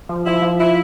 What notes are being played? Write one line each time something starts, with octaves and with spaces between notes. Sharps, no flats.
F3
F3 E4
F3
E4